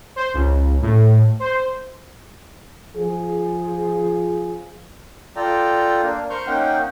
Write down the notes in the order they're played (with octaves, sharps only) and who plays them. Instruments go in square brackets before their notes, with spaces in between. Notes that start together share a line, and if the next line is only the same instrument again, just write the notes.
[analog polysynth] C5
C#2
A2
C5
[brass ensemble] F3 G#4
[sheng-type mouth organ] F4 A4 D5 G5 A#5
A#3 D4
A#4 C5 C#6 F6 G6
A#3 C#4 D#4 F#5 G5